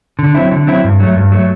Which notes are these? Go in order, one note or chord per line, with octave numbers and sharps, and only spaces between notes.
D3
F#3 C4 E4
D3
F#3 C4 E4
G2
F#3 A3
G2
F#3 A3